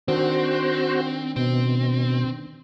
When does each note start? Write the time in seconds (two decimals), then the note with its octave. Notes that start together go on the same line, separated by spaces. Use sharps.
0.08 D#3 C4 D4 F#4 C5
1.36 B2 C4